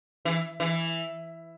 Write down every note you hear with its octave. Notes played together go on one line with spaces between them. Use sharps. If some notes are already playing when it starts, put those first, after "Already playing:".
E3
E3